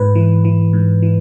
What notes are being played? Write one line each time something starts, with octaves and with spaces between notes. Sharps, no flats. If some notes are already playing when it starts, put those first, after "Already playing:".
Already playing: G#2 B4
E3
E3
G#2
E3